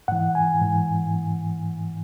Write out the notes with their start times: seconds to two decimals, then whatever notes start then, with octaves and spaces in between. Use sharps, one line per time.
0.08 G#2 E3 F#5
0.35 G#5
0.62 G#2 E3